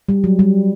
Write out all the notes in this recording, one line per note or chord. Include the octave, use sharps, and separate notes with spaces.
G3
F#3
G3